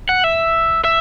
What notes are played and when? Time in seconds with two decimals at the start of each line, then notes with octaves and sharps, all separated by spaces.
0.09 F#5
0.24 E5
0.84 E5